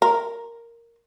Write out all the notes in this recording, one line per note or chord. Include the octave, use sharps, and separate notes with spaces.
A#4